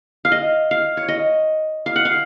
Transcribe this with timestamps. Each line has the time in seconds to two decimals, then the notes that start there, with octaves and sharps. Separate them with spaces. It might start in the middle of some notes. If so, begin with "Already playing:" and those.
0.25 F5
0.32 D#5
0.71 F5
0.97 C#5
1.08 D#5
1.86 F5
1.96 F#5
2.05 F5